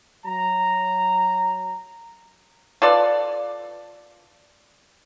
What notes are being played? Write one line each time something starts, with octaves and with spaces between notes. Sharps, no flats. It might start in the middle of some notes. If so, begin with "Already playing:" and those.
F#3 A#5
F4 A4 B4 D5